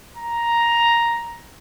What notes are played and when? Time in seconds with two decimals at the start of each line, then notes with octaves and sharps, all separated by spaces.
0.17 A#5